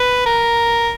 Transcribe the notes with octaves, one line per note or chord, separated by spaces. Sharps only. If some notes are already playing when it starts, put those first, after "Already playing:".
Already playing: B4
A#4